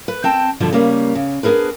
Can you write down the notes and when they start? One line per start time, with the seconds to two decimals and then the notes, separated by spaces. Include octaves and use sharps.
0.08 B4
0.24 C4 G5 A5
0.60 G2 B2 D3 F3 B3
0.73 C#3 G3 A#3
1.15 C#3
1.43 B3 D4 D#4 G#4 A#4 B4